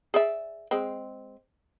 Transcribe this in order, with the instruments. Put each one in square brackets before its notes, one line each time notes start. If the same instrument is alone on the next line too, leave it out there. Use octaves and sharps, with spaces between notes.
[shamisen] G#4 D5 E5
G#3 C4